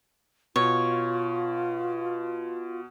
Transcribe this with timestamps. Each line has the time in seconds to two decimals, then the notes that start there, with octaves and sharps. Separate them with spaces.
0.56 B2 F4 C#5